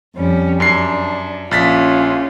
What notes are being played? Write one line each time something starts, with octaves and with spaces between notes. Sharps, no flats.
F2 G3 C#4
F#2 D4 C7
A#1 C#4 F4 A6 B6